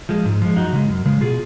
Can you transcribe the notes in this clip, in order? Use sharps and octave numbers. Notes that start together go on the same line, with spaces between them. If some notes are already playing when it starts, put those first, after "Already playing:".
F3 G#3
G#2
F3 G#3
F#2 D#4 F#4
C#3 G#3
F#2
C#3 G#3
B2 F4 G#4